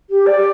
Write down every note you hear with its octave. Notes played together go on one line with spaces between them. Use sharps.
G4
D5